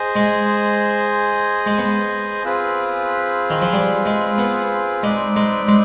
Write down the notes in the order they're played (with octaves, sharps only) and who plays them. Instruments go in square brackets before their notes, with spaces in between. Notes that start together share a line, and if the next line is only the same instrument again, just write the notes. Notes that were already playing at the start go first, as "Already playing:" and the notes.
Already playing: [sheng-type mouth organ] G#4 C5 D#5 G#5
[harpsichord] G#3
G#3
B3
[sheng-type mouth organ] C4 F4 G#4 B4
[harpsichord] D#3
F3
G3
G#3
B3
[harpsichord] G#3 [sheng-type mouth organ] C4 D#4 B4 D5
[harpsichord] G#3
G#3